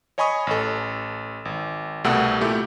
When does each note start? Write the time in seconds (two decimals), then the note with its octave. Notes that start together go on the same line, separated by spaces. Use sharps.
0.18 C#5 D#5 G#5 B5 C#6 D#6
0.47 A1 A4
1.45 G#1
2.04 C2 B2 G3 A3 F#5 E6
2.41 A#2 A3 E4 G4